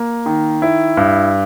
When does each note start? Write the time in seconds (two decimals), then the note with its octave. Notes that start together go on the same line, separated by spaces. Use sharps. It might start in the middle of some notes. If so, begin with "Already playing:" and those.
Already playing: A#3
0.26 D#3
0.62 E4
0.97 G2